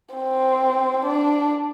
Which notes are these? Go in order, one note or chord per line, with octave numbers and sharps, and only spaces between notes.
C4
D4